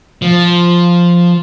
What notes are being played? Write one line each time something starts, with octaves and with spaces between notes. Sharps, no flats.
F3